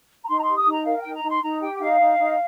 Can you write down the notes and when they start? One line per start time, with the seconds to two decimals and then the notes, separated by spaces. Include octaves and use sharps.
0.24 A#5
0.28 D#4 C6
0.38 A#5
0.42 G4 C6
0.57 D#6
0.67 D#4 A#5
0.85 A#4 F5
0.99 G5
1.04 D#4
1.14 A#5
1.23 D#4
1.28 C6
1.42 D#4 A#5
1.61 G4 G5
1.75 G5
1.80 D#4 F5
2.00 D#4
2.18 D#4